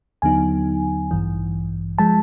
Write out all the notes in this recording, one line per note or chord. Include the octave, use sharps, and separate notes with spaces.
D#2 D3 F#3 B3 D#4 G#5
A1 G2 E3
F3 G#3 A5